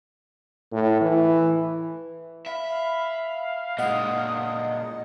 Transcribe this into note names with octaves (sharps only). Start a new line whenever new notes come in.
A2
E3
E5 F5 B5
A#2 G#3 D#5 F#5 D#6